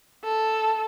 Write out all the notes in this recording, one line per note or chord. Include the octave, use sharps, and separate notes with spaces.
A4